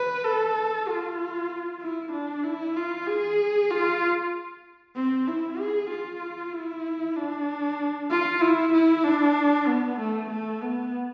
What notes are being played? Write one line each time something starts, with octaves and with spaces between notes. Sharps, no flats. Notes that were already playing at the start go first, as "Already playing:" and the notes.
Already playing: B4
A4
F4
E4
D4
E4
F4
G#4
F4
C4
E4
G#4
F4
E4
D4
F4
E4
E4
D4
B3
A3
A3
B3